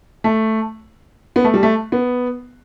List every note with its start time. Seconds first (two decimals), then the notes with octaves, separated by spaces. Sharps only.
0.24 A3
1.36 B3
1.44 A3
1.54 G3
1.63 A3
1.92 B3